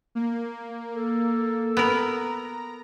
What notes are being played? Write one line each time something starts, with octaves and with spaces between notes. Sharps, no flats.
A#3
A4
B3 A#4 A#5